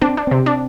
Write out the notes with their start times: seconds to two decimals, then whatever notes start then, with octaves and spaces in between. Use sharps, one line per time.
0.01 C4 D4
0.17 D4
0.27 C3 C4
0.46 D4